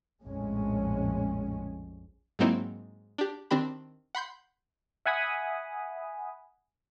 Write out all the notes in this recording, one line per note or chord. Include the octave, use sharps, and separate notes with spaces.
A#1 F2 A2 G#3 C#4
G#2 F#3 A#3 C4 D#4 E4
D4 G4
D#3 C4 D4 G4 G5 B5
F#5 B5 C6 G6
E5 F#5 G#5 B5 D#6